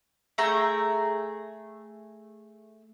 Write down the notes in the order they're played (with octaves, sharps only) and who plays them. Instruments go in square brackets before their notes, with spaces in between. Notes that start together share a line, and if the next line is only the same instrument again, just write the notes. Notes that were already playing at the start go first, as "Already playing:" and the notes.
[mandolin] A3 G#4 G5 A#5